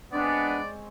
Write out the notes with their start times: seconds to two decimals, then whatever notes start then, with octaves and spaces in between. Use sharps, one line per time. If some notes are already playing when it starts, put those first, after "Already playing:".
0.13 G#3 B3 C4 D4 C#5 D5